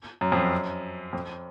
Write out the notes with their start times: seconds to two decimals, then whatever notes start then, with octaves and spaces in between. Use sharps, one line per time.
0.21 F#2
0.32 F2
0.37 F#2
1.13 F2